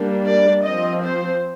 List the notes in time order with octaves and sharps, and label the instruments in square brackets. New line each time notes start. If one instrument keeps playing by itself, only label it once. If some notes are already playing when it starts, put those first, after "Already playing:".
Already playing: [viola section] G3 A#3 D4
D5
F3 C4 D#5
C5